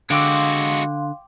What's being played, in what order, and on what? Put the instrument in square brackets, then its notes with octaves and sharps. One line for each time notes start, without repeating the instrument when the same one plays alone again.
[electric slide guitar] D3 [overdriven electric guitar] G#3 F#4 [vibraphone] F5 C6 [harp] G5 D6 E6